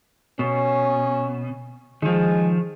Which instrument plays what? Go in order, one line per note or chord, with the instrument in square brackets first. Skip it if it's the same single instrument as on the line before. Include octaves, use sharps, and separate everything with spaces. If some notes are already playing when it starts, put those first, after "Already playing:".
[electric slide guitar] B2 [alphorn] C#4
[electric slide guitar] D#3 F3 [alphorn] G#3